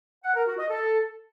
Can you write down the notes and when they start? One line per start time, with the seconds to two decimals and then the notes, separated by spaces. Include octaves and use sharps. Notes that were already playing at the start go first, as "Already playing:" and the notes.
0.24 F#5
0.35 A#4
0.47 F#4
0.58 D#5
0.70 A4